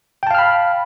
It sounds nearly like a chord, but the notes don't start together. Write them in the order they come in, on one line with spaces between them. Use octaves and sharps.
G5 A5 F5 F6 B5